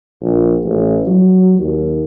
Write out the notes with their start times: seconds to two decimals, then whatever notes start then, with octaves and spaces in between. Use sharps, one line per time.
0.21 A#1
0.65 A1
1.07 F#3
1.59 D#2